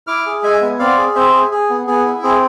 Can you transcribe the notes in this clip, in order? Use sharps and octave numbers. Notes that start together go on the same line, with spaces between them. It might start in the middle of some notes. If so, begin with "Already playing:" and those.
E4 D6 F6
G#4
G#3 E5 G#5
B3
C4 D5 F5
G#4
C4 C5 E5
G#4
G#4
B3
B3 G#4
E4
C4 G#4